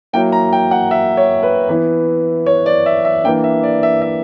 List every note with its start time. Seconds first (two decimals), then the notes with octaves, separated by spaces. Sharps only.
0.13 F#3 A#3 E4 G5
0.32 A#5
0.53 G5
0.71 F#5
0.91 E5
1.17 C#5
1.43 B4
1.69 E3 B3 E4 B4
2.46 C#5
2.66 D5
2.86 E5
3.05 E5
3.24 E3 A#3 D4 G5
3.44 E5
3.63 D5
3.83 E5
4.02 E5